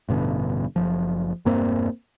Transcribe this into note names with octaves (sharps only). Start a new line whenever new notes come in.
A1 G2 B2 D3
F#1 C#2 F3
E1 G2 A#3 C4